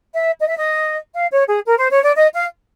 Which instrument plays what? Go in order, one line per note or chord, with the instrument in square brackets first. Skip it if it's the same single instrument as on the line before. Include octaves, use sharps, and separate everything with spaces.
[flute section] E5
D#5
E5
D#5
F5
C#5
G#4
A#4
C5
C#5
D5
D#5
F5